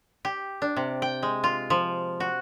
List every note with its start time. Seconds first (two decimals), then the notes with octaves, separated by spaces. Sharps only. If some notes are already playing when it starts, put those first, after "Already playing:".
0.25 G4
0.62 D4
0.77 C3
1.02 G5
1.23 G#3
1.44 F4
1.70 F3
2.20 F#4